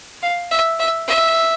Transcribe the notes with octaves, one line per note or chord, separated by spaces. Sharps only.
F5
E5
E5
E5